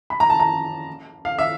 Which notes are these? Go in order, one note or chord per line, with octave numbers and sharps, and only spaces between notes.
B5
A#5
A5
A#5
F5
E5